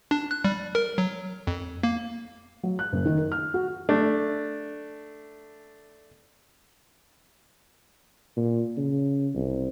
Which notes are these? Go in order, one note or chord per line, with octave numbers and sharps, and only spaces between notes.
D4
F#6
G3
A#4
F#3
F2
A#3
F#3
F#6
F#1
D#3
A#4
F6
F#4
A3 D4
A#2
C#3
C2